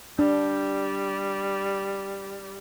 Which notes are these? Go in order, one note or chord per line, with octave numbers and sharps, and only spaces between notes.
G3 D4